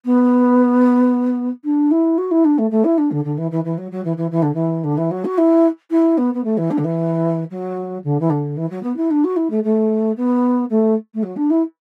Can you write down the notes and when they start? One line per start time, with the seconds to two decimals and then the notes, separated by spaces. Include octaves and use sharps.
0.05 B3
1.64 D4
1.91 E4
2.18 F#4
2.31 E4
2.45 D4
2.58 A3
2.71 A3
2.84 E4
2.98 D4
3.11 D3
3.24 D3
3.38 E3
3.51 E3
3.64 E3
3.78 F#3
3.92 F#3
4.04 E3
4.17 E3
4.31 E3
4.42 D3
4.54 E3
4.84 D3
4.97 E3
5.11 F#3
5.25 F#4
5.38 E4
5.91 E4
6.18 B3
6.34 B3
6.44 A3
6.57 E3
6.71 D4
6.78 D3
6.84 E3
7.50 F#3
8.04 D3
8.20 E3
8.30 D3
8.57 E3
8.70 F#3
8.83 B3
8.97 E4
9.11 D4
9.24 F#4
9.36 E4
9.50 A3
9.64 A3
10.17 B3
10.70 A3
11.14 A3
11.23 F#3
11.36 D4
11.50 E4